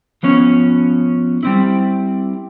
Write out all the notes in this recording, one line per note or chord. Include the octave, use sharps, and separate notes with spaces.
F3 B3 C#4
G3 C4 E4